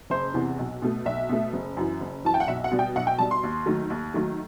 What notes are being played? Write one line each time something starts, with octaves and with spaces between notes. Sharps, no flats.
F#1 C5
E2 C3 E3
B1
B2 A3
B1 E5
B2 A3
F#1
F#2 E3
F#1
F#2 E3 A5
G5
F#5
B1 E5
F#5
B2 G3
G5
B1 F#5
G5
B2 G3 A5
C6
D#2
D#3 F#3 A3
D#2
D#3 F#3 A3